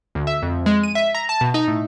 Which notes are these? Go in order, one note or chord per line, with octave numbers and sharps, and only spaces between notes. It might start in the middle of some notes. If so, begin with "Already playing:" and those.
D2
E5
F2
G#3
D#7
E5
A#5
A5
B2
D#4
A2